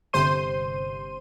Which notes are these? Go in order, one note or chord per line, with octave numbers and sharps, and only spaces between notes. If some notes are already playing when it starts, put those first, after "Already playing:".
G1 C3 C5 C6 D#7